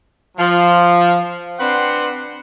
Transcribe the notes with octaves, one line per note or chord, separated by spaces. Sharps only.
F3
C4 D4 B4 F#5 C6